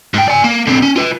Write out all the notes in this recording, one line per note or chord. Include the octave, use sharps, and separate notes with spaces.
G#2 G5
D5 G#5
A#3
D3 C4
C#4
F4 B4